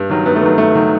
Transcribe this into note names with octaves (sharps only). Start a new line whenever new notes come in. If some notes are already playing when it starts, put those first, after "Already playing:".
Already playing: G2
D#3 F#3
G2 B3
A3
D#3 F#3
G2 A3
D#3 F#3